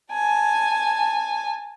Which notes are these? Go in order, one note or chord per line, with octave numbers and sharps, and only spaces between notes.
G#5 A5